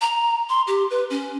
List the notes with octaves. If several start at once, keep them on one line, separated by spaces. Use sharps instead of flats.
A#5
C6
G4
B4
C#4